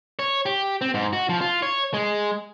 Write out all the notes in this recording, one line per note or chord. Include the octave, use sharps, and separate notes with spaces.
C#5
G4
C4
G#2
F#4
F3
F4
C#5
G#3